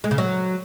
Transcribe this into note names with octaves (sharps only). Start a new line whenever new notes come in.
G#3
C#3
F#3